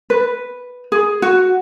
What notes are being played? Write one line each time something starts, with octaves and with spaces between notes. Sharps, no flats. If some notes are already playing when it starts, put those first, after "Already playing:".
B4
G#4
F#4